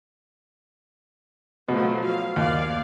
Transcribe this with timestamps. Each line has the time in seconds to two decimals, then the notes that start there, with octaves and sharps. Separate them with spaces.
1.69 B2 F3 F#3 A3
2.04 F5
2.36 D#2 D5 F5